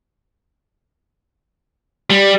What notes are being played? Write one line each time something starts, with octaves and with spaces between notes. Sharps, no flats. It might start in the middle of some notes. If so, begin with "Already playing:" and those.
G3